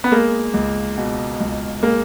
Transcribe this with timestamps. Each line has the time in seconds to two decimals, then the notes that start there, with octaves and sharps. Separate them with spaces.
0.04 B3
0.12 G#3 A#3
0.54 C#2
0.98 B2
1.40 C#2
1.83 G#3 A#3